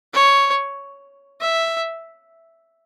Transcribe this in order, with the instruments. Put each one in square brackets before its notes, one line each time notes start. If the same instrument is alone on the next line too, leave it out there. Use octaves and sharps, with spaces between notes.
[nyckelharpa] C#5
E5